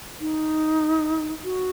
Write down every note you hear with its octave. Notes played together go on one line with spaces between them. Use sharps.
D#4
F#4